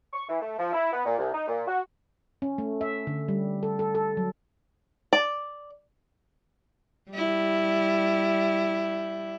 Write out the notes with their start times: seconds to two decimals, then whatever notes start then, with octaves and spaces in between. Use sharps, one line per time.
0.13 C#6
0.28 E3
0.41 A3
0.58 F3
0.72 E4
0.92 B3
1.05 A#2
1.18 C2
1.33 D#4
1.47 A#2
1.67 F#4
2.42 C#4
2.58 A3
2.81 E5
3.07 D3
3.28 G3
3.63 A4
3.79 A4
3.95 A4
4.17 F#3
5.13 D5
7.11 G3 E4